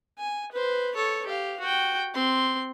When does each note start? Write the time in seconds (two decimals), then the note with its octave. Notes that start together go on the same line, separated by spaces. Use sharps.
0.19 G#5
0.52 B4 C5
0.95 A4 C#5
1.26 G4 F5
1.60 F#4 G5
2.14 C4 C6